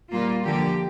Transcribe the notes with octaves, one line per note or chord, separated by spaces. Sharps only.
A#2 G3 A#3 F4
D3 F3 A#3 G4